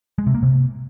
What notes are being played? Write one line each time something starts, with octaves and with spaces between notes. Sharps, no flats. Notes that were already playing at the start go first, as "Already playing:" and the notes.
G#3
C3
A#3
C3